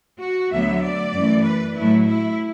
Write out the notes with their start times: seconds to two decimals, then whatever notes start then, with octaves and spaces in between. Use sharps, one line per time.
0.21 F#4
0.52 D2 D3 F#3 B3 E5
0.83 D5
1.14 F#2 E3 A3
1.45 B4
1.77 A2 F#3 A3 E4
2.08 E4